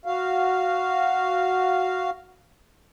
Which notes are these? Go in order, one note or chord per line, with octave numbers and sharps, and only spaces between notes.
F#4 F5